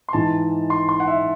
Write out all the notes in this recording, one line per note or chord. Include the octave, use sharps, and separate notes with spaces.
C6
G#2 E3 G#3 A5
C6
C6
F#5
E5